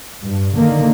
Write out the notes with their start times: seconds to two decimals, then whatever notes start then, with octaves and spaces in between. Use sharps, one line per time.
0.21 G2
0.56 D3 D#3 A#3